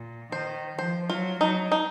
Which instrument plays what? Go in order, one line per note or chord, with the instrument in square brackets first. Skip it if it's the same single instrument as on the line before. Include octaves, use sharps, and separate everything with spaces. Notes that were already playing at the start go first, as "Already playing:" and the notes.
Already playing: [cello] A#2
[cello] D#3 [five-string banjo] C5
[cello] F3 [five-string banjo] C5
[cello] F#3 [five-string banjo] F4
[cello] F#3 [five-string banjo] D#4
[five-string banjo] D#4